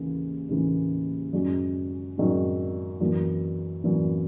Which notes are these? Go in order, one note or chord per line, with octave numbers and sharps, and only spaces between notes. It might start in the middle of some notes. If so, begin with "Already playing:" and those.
Already playing: D#2 C#3 E3 A#3 C#4
D#2 C#3 E3 A#3 C#4
F#2 D#3 G#3 C#4
F#2 D#3 G#3 C#4
F#2 E3 A#3
F#2 E3 A#3